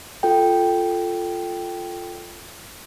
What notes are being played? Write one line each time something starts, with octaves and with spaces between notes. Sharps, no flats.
F4 A4 G5